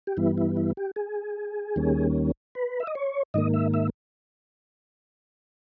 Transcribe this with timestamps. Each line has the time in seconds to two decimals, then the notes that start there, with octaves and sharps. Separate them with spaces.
0.07 G4
0.17 G2 E3 G3 B3 E4
0.38 E4
0.57 E4
0.77 G4
0.96 G#4
1.76 D#2 D#3 G3 A#3 C#4
2.55 B4
2.80 E5
2.87 D#5
2.95 C#5
3.34 G#2 D#3 A#3 D#5
3.54 E5
3.74 E5